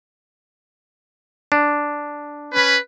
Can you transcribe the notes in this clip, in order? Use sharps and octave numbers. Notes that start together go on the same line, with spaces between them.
D4
C#4 B4